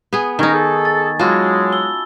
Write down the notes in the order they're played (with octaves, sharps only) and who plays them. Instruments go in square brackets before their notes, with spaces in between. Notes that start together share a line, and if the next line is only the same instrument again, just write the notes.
[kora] B3 G#4
[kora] D#3 D#4 [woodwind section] G#3 C#4 A#4 [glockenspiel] G#5 C#6 G#6
[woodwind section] G#4 A4
[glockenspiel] A6
[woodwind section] F#3 G#3 [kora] F4 F#4 [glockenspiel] A5 B5 E6
[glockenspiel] E6 G7